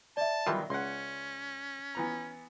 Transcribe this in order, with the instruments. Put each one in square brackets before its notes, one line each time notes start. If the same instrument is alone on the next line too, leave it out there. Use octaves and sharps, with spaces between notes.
[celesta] D5 E5 [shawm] A5
[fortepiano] D#3 F#3 [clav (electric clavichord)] E3 G3 F4
[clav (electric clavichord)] C#2 [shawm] C#4 [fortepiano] F#5 C6
[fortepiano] E3 B3 A#5